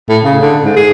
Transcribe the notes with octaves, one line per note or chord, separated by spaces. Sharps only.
A2
C#3
D3
G#2
G#4